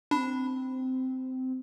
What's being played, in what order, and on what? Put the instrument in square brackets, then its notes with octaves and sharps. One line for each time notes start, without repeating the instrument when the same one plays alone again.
[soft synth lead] C4 [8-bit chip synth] D4 [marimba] B5